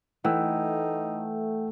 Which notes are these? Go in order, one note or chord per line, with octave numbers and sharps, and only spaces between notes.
E3 A3 D#4 F#5 G5 E6